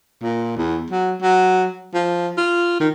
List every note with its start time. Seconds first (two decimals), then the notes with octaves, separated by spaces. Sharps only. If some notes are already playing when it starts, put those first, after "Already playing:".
0.23 A#2
0.57 E2
0.90 F#3
1.22 F#3
1.94 F3
2.37 F4
2.80 D#3